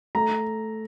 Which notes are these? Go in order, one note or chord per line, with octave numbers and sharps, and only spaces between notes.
A3 A#5